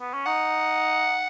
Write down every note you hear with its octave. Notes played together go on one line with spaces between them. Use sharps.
B3
C#4
D#4 F#5